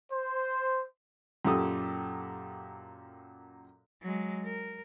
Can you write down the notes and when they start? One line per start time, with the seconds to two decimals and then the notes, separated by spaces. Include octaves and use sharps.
0.11 C5
1.45 F#2 A#2 G4 A4 D#6
4.02 F#3 G#3
4.44 A#4